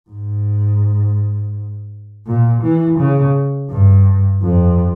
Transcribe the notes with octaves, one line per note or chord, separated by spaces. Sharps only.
G#2
A#2
E3
C#3
G2
F2